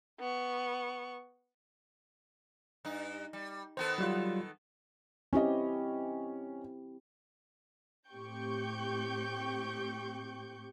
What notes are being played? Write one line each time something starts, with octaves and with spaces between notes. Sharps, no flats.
B3 C#6
G2 D#4
G3
D#3 B3 A4 C5
F#3 G3 F4
C4 C#4 E4 G4 D#5
A2 C4 G4 G5 C#6 G6